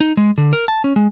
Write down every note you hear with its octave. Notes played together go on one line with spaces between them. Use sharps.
D#4
G#3
D3
A#4
A5
C#4
G#3